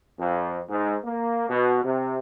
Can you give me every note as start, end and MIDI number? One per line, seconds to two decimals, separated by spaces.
0.18 0.60 41
0.69 0.96 44
1.04 1.46 58
1.49 1.80 47
1.84 2.19 48